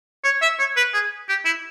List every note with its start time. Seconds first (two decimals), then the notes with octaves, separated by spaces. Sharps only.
0.24 C#5
0.42 E5
0.59 C#5
0.77 B4
0.94 G#4
1.29 G4
1.45 E4